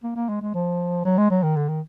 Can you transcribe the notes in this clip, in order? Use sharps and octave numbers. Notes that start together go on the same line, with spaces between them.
A#3
A#3
G#3
G#3
F3
F#3
G#3
F#3
D#3
D3
D#3